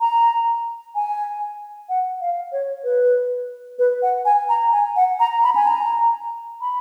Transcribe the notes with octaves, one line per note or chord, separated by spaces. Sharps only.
A#5
G#5
F#5
F5
C#5
B4
B4
F#5
G#5
A#5
G#5
F#5
A#5
B5
G#5
A#5
B5